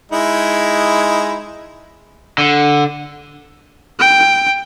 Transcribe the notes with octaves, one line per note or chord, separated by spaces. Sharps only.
G#3 D#4 E4
D3
G5